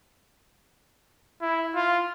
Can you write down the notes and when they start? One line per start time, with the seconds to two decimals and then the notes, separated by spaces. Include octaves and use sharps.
1.42 E4
1.76 F4